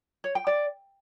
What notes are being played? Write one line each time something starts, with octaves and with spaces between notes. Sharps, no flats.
C#5
G5
D5